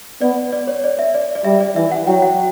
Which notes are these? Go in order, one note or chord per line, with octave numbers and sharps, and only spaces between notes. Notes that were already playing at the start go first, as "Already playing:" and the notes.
B3 D5
D5
C#5
D5
E5
D5
D5
G3 E5
D5
E3 E5
F#5
F#3 G5
F#5